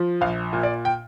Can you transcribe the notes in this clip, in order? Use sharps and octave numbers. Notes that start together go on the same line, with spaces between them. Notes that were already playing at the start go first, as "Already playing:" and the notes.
Already playing: F3
A#1 F5
A#2
D5
G5